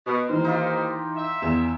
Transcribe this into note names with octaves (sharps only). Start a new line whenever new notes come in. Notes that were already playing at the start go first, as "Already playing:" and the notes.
B2
D#2 D#3 E3 A#4 C5
D#4 F4 G4
E5
E2 E7